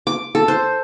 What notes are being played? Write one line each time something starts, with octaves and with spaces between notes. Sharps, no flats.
D6
A4
C5